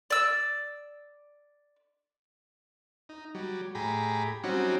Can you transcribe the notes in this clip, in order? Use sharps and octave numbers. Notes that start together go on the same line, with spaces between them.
D5 E6
D#4
F#3 G3
A2 G4 G#4 A#5 B5
F#3 G3 C4 C#4 D#4 F#4